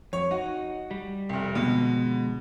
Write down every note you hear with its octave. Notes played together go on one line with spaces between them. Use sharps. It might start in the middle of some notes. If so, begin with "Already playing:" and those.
F2 C#5
D#4 F#4
G3
F1 C2
B2 D3 F3 G#3